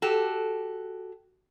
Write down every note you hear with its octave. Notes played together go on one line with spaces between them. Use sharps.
F#4 G4 A4